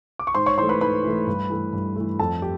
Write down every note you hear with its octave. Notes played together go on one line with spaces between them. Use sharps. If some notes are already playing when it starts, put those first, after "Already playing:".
D6
C#6
G#2 C5 C6
C#5 C#6
E3 A3 C5 C6
B4 B5
G#2 B4 B5
E3 A3
G2
E3 A3
G2
E3 A3
F2 A4 A5
G4